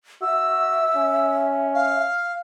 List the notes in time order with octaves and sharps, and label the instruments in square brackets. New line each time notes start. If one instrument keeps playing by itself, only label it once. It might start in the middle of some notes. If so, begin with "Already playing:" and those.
[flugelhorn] F#4 [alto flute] E5 [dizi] E6
[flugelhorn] C#4
[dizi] F5